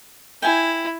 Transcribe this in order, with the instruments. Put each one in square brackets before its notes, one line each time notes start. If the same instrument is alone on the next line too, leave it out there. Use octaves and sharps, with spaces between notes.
[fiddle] E4 [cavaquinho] G5 G#5